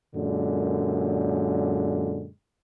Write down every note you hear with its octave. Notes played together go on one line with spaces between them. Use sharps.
F#2 A#2 D3 G#3